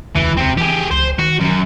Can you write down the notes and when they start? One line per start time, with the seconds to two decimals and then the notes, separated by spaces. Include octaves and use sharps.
0.15 E1 D2 C#3 E3
0.37 C3 C4
0.57 E3 G4 G#4
0.91 C#2 C5
1.18 D#3 F#4
1.40 F#2